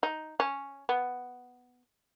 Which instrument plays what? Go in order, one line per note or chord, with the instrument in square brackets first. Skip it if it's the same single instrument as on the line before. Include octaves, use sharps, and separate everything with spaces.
[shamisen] D#4
C#4
B3